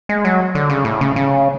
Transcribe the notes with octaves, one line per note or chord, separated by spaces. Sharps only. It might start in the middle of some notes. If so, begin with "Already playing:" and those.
G#3
F#3
D3
C#3
A2
C#3
C#3